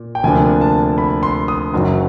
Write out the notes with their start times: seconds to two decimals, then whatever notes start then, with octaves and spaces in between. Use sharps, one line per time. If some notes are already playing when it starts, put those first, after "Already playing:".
Already playing: A#2
0.15 G5
0.23 D2 C3 F3 A#3 D4 G#5
0.61 A5
0.98 B5
1.23 C6
1.48 D#6
1.74 F#1 F#2 D#3 F#3